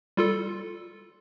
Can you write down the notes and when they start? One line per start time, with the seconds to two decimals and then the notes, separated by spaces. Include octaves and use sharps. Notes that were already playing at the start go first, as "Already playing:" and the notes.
0.17 G3 F4 A4